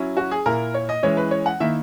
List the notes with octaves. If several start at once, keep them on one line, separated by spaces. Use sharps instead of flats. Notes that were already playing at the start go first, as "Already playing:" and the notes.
Already playing: F#3 C#4 E4
F#4
G#4
A#2 A#3 E4 A#4
C#5
D#5
E3 G#3 C#4 E4 C#5
B4
C#5
F#5
D#3 A#3 E4 E5